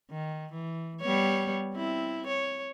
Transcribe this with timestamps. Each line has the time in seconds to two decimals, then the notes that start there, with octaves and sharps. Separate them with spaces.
0.11 D#3
0.53 E3
1.01 G3 B3 C#5
1.74 C4 E4
2.27 C#5